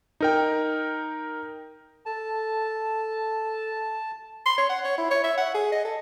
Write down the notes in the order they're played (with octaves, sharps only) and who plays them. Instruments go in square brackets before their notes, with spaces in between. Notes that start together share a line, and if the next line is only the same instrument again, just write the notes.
[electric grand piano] D#4 A#4 G5
[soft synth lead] A4 [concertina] A5
[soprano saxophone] C6
C#5
F#5
C#5
E4
C#5
E5
F#5
G#4
D#5
A4